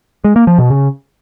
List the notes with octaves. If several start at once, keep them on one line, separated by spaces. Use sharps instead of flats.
G#3
A#3
F3
B2
C#3